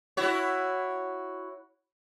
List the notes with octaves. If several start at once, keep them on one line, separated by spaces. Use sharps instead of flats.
E4 F#4 C#5